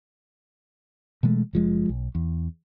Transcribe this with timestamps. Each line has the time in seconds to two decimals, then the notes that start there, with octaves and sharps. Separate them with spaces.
1.23 B2 E3 G#3 A3
1.53 F#1 F3 G#3
1.89 B1
2.15 E2